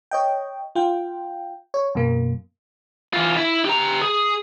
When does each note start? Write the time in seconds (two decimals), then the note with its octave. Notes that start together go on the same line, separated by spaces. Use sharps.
0.11 C#5 D#5 G5
0.75 F4 G5
1.74 C#5
1.95 F#2 B2 A#3
3.13 E3 F4
3.37 E4
3.65 G4 A#5
4.02 G#4